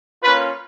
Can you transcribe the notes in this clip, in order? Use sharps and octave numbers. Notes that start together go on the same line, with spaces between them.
A#3 C#4 F4 B4